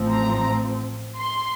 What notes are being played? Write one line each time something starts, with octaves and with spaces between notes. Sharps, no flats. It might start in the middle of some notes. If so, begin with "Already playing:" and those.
Already playing: A1 A2 F3 C4
A#5
C6